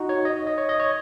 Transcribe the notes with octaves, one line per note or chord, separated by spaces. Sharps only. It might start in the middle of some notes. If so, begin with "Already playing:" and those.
Already playing: D#4 F#4
C#5
D#5
D#5
C#5
D#5
C#5